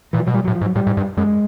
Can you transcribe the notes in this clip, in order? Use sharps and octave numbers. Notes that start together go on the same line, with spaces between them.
A#2 E3
F3
B2 F#3
A#2 G3
F#3
A2
F3
G#2
F#3
A2 G3
G#2
G2
F#2 G#3